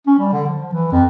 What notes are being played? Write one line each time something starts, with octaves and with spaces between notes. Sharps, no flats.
C#4
G3
D3
F3
E3
F2